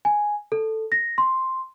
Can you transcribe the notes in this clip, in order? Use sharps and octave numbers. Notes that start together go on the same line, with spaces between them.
G#5
A4
A#6
C6